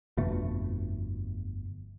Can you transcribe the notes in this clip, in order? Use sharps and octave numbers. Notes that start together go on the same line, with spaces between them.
G1 F2 B2 A3